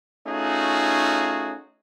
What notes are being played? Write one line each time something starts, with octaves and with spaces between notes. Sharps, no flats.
A3 C#4 D#4 F4 F#4 G#4